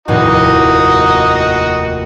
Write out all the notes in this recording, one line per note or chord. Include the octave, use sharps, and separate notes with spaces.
F1 D#2 A2 D#4 F#4 D#5